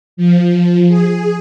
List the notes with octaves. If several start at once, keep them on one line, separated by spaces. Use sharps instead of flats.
F3
G#4